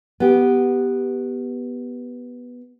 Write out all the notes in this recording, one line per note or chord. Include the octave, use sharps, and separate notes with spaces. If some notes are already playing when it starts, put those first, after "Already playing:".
B3 G4